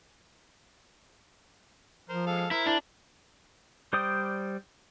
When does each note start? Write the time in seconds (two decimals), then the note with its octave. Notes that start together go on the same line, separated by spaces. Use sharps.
2.09 F3 A#4 C5
2.27 G#3 A4 F5
2.51 E4 A#4 C5
2.66 D4 E4
3.93 G3 C5 D5 G5 D#6